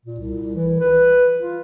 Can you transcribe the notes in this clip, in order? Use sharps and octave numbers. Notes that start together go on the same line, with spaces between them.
A#2
C2
E3
B4
F4